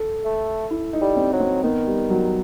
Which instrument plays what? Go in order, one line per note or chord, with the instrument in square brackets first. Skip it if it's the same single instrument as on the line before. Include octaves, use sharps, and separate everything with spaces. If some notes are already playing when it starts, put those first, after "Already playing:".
Already playing: [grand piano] A4
[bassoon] A3
[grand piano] E4
D#4
[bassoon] G3
[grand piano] C4
[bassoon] F#3
[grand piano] C4
[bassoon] D#3 [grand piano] B3
[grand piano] G3
F#3